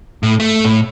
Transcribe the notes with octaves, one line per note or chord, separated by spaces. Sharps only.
A2
A3
A2